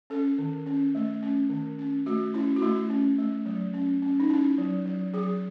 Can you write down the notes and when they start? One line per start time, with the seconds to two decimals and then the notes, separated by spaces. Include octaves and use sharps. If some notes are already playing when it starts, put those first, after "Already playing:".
0.10 C#4 A4
0.38 D#3
0.66 C#4
0.95 A3
1.22 C#4
1.50 D#3
1.78 C#4
2.06 A3 F#4
2.34 C#4 E4
2.56 F#4
2.62 A3 E4
2.90 C#4
3.19 A3
3.46 F#3
3.74 C#4
4.02 C#4
4.20 D#4
4.30 C#4 E4
4.58 F#3
4.85 F#3
5.14 F#3 G#4